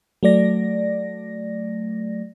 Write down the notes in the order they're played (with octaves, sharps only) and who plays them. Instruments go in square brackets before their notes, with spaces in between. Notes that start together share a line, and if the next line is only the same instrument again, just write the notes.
[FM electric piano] F#3 A3 D5 A#6